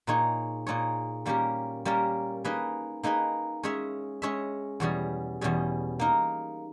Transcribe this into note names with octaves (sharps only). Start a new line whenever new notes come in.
A#2 A#3 D#4 G#4 C#5
A#2 A#3 D#4 G#4 C#5
G3 A#3 C#4 G4 A#4
G3 A#3 C#4 G4 A#4
A#3 D#4 G#4 B4 D#5
A#3 D#4 G#4 B4 D#5
G#3 C#4 G#4 C#5 E5
G#3 C#4 G#4 C#5 E5
E2 B2 G3 C#4 G#4
E2 B2 G3 C#4 G#4
A#3 D#4 A#4